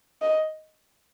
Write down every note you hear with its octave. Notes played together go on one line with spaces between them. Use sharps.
D#5